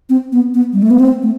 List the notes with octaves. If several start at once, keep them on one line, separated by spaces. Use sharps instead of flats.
C4
B3
B3
G3
A3
B3
C4
A3